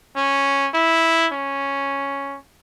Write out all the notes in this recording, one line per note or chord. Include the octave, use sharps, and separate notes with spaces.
C#4
E4
C#4